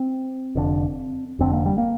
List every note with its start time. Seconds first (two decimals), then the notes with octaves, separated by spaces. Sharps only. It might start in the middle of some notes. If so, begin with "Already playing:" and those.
Already playing: C4
0.55 F1 F2 D3
1.39 F1 F2 D3 C4
1.53 A#3
1.66 G3
1.78 A#3